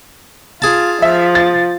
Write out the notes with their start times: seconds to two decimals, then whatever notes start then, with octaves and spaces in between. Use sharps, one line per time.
0.62 F4 G#4 A5
1.02 F3 E5
1.35 A6